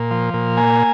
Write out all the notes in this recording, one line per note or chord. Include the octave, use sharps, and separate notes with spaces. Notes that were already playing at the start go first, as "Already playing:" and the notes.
Already playing: A#2
F3
A#2
A#3 G#5